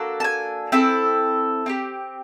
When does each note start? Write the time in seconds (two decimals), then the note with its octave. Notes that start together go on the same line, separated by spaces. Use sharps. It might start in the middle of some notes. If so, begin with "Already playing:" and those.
Already playing: A#3 D4 F#4 A4
0.20 A5
0.24 G#5
0.72 C4 E4 A4
1.66 C4 D#4 G4